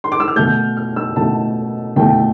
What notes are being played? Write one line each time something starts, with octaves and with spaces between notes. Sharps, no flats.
C6
D6
E6
F6
B2 A3 G6
F6
E6
B2 A3 A5
B2 A3 G5